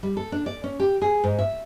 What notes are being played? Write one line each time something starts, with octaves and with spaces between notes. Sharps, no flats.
G3
A4
D4
D5
C#4
G4
G#4
G#2
E5